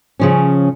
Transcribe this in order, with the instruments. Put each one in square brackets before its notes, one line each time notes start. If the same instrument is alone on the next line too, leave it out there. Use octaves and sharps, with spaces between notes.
[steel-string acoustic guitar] C#3 F3 C#4